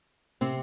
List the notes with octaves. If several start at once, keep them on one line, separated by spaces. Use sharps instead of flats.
C3 C4